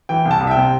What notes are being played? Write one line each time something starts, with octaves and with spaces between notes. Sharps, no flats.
E3 G5
C2
A5
C2
E5
G5
C3